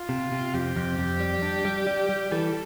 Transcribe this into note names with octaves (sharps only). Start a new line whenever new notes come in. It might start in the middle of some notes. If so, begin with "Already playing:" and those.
Already playing: F4
C3
C3
F2 G4
F2
F2
G3
D4
G3
G3
G3
E3 A4